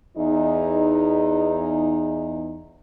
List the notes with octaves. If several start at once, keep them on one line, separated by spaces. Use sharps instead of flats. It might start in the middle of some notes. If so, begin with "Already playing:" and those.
E2 D#4